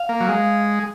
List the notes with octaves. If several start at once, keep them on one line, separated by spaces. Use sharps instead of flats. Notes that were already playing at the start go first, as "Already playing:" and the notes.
Already playing: F5
A#3
F#3
G#3